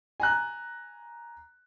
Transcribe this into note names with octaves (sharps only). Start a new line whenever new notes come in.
G#5 A#5 F#6